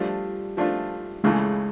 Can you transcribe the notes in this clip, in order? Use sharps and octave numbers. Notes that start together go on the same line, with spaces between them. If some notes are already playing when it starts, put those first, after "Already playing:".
Already playing: F3 G3 A3 D4 F4
F3 A3 D4 F4
C#2 C#3 E3 G#3 A3